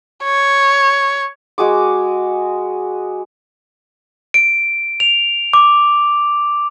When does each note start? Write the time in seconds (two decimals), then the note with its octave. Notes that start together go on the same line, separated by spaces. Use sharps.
0.24 C#5
1.58 G#3 F#4 G#4 D6
4.34 D7
5.00 F7
5.53 D6